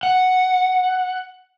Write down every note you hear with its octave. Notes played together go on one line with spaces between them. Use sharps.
F#5